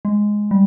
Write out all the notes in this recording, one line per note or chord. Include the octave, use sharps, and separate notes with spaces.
G#3
G3